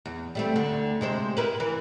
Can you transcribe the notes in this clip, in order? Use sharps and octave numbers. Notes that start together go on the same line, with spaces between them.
E2
G3 A3 C4
D2 D3
C3 G#3 C5
E4 A#4 B4
E3